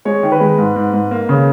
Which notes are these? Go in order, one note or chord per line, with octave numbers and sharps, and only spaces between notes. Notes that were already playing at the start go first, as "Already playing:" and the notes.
G#3 C#5
D#3
B4
G#3
G#2
G#2
G#2
A#3
C#3